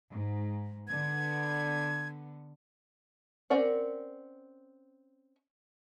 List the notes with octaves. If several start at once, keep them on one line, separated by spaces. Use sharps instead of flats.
G#2
D3 B3 G#6
C4 C#4 A#4 D5 F#5